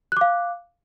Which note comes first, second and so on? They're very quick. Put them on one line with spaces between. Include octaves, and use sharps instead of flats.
F#6 D6 F5